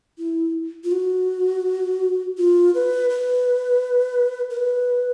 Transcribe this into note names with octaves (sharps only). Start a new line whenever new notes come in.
E4
F4
F#4
F4
B4
B4
A#4
B4